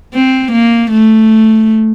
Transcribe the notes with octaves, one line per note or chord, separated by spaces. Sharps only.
C4
A#3
A3